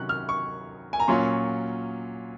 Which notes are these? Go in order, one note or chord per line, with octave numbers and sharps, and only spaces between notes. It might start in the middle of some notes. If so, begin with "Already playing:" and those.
Already playing: C3 D#3 F#3 C#4 F#6
F6
C#6
G#5
A#5
A#2 F#3 C#4 F4 C6